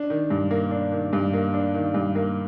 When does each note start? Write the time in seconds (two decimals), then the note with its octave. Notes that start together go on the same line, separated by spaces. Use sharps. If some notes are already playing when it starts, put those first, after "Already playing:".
Already playing: D4
0.10 D#3
0.30 G2
0.51 A#3
0.71 D4
0.92 D#3
1.13 G2
1.33 A#3
1.54 D4
1.74 D#3
1.94 G2
2.15 A#3